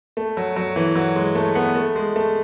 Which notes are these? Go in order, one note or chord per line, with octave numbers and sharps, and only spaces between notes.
A3
F#3
F#3
E3
F#3
G#3
A3
B3
A3
G#3
A3